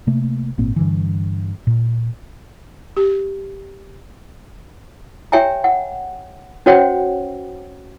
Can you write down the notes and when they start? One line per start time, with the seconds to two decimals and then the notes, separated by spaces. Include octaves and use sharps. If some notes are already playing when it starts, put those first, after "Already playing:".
0.07 C3 A3 A#3
0.58 G#1 A#2 A#3 C4
0.76 G2 D3 E3
1.67 A#2
2.97 G4
5.32 G4 C#5 E5 G5 G#5 A#5
5.64 F#5
6.66 C#4 F#4 C5 C#5 F#5 G5